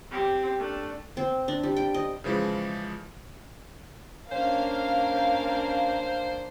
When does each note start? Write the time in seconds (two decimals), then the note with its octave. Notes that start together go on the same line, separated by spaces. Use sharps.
0.11 C4 G4
0.59 A3 D4
1.17 C4
1.48 D4
1.63 G3
1.77 G5
1.94 D#5
2.24 C#3 E3 F3 G#3
4.31 A#3 C#4 D4 C5 F5